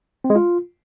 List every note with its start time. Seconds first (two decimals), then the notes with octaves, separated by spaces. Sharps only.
0.24 C4
0.30 G#3
0.35 F4